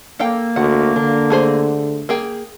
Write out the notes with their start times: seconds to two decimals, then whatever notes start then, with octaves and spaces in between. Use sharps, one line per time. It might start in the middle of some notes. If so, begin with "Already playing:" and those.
0.19 A#3 A4 F5 G5
0.56 D2 F#5
0.96 D3 D4
1.30 A3 G#4 C5
2.09 A#3 G#4 G5